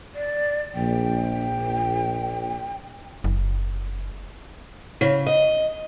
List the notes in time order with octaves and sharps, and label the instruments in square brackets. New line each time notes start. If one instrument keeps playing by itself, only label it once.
[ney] D5
[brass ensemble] A#1 [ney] G5
[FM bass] F#1
[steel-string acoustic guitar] C#3
D#5